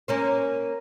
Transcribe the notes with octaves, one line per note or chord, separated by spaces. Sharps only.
A#3 C#4 C5